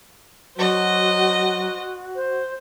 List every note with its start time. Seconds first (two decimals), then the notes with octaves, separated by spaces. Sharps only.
0.57 F#3 F#4 C5 D#5
2.16 C5